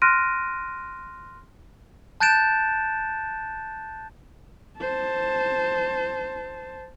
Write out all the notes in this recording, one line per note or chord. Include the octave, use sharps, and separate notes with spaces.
C6 F6 F#6 A#6 D7 D#7
A5 F#6 G6 A6 D7 E7
C5 A5